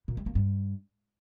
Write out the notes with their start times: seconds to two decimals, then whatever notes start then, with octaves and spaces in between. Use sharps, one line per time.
0.08 A#2
0.17 G3
0.26 A#3
0.35 G2